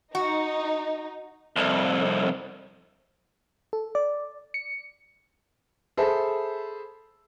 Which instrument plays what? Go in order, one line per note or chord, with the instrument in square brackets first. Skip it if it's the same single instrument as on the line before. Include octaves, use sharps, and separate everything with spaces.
[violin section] D#4 [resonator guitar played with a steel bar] F#4
[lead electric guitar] C2 F2
[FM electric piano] A4
D5
C#7
[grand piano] G#4 A4 C5 E5 B5